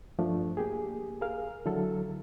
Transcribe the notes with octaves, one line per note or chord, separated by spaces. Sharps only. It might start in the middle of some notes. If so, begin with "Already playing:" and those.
G2 F3 A3 D4
A#3 G4 G#4
G#4 A#4 F5 F6
D3 F#3 E4 A4